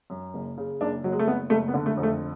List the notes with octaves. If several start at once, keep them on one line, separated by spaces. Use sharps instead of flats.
F#2
F#1
C#3
F#1 D4
F#1 F#3
G#3
A3
F#1 B3
F#1 A3
B3
D3
A3
F2
A3